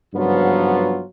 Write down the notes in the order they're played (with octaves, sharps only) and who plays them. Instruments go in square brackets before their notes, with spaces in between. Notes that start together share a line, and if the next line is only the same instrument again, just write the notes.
[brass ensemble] F#1 G2 F3 F#3 B3 F4